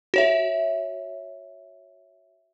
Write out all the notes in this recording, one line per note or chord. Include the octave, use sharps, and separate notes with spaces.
F#4 C#5 E5